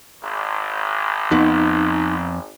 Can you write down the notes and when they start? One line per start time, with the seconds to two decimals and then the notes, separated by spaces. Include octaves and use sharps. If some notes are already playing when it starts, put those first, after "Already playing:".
0.22 G#1
1.31 F2 B3 D#4